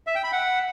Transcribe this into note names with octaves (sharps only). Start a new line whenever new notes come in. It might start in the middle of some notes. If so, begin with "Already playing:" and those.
E5
G5
B5
F#5